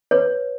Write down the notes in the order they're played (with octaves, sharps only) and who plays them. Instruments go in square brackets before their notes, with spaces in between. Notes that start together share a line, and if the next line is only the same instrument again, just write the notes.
[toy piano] B4 C#5